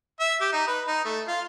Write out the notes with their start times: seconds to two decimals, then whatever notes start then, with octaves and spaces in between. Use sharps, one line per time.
0.20 E5
0.41 G4
0.53 D#4
0.67 B4
0.87 D#4
1.05 A3
1.28 F4